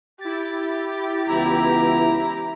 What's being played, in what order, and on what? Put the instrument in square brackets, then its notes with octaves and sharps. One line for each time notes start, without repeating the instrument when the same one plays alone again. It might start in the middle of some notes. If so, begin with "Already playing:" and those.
[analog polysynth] E4 A6 [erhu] G4
[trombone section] C#2 E3 B3 [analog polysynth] E4 [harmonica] A#5